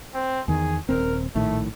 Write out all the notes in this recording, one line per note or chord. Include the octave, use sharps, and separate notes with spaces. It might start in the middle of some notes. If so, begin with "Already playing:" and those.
C4
E2 D#3 G#4
D#1 C4 A#4
A#1 A2 D#3 A3